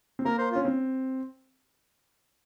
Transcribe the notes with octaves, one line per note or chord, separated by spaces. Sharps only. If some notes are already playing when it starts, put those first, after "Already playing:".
C4
A#3 A#4
C5
C#4 F4
C4